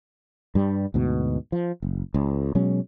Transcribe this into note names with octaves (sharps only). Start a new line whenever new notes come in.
G2 G3
D2 G#2 B2
F3
F#1
C#2
B2 F#3 G#3 C#4